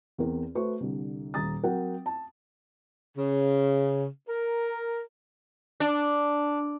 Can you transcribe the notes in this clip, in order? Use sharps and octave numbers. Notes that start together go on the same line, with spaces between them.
E2 C4 A#4
A3 F#4 B4 C5 C#6
C2 D3
D#1 A#5 D#6 A6
F#3 C4 A#4 F#5 G5
A5
C#3
A#4
D4